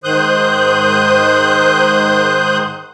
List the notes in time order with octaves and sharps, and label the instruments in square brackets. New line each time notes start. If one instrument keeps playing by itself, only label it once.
[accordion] G#2 D#3 C5 D#6 F#6 G6